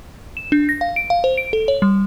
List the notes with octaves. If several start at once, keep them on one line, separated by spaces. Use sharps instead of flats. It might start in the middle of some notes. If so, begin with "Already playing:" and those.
E7
D4
A#6
F5
D7
F5
C5
D7
A4
C#5
G3